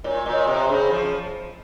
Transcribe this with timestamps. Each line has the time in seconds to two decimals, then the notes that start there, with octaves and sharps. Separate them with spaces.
0.04 A#2 C#5
0.26 A#2
0.33 D#5
0.47 C3
0.62 C5
0.69 C#3
0.91 F3